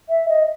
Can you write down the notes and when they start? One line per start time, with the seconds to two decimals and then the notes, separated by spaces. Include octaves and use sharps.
0.09 E5
0.29 D#5